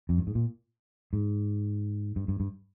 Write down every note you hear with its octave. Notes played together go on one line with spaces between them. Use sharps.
F2
G2
G#2
A#2
G#2
G2
G2
G2